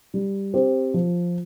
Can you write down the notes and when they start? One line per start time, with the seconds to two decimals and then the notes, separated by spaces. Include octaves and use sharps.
0.14 G3
0.54 C4 G4 C5
0.94 F3